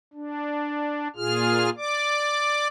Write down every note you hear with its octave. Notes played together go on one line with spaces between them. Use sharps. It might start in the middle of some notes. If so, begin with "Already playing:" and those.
D4
A#2 F4 G#4 F6
D5 D6